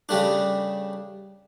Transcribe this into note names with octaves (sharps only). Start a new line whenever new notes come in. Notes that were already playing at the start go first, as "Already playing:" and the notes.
C#3 G3 A3 D4